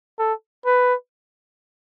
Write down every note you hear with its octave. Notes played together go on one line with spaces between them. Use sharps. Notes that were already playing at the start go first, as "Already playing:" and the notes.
A4
B4